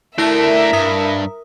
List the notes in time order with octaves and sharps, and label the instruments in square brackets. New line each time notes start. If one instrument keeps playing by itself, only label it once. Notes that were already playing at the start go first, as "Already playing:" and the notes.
[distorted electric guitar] A3 D4 [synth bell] E4 A#6 [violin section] A#4 E5
[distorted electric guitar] G2 [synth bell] D#6